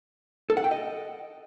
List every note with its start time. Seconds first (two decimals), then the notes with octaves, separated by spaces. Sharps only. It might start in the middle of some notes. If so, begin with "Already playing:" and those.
0.50 A4
0.57 F#5
0.64 G5
0.71 D#5